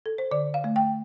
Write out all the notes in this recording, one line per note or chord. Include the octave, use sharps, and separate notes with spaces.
A4
C5
D3 D5
F5
A3
G5